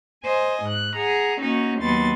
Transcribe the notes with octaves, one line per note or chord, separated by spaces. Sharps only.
C5 D#5 G#5
G#2 F#6
G#4 F#5 A#5
A#3 C#4 D#4 F#4
D#2 F#3 B3 C6 A6